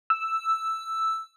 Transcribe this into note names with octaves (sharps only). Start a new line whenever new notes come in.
E6